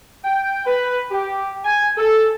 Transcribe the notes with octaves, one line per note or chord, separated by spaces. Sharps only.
G5
B4
G4
G#5
A4